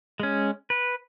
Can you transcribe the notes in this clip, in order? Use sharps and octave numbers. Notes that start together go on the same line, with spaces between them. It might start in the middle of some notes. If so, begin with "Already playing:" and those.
G#3 C#4
B4